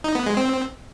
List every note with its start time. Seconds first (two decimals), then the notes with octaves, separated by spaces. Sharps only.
0.04 D#4
0.15 B3
0.26 G#3
0.37 C4